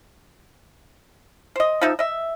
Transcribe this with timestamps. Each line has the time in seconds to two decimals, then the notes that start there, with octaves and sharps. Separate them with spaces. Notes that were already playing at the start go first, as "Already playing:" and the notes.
1.56 C5 D#5
1.81 F3 D#4 E5
1.99 D#5 E5